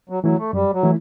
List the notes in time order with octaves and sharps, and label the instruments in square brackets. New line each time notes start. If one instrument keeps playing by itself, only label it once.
[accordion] F#3
[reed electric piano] E3 A3 E4 [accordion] F#3
[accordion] A3
[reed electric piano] F#2 [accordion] G3
[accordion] F#3
[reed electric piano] E3 A3 E4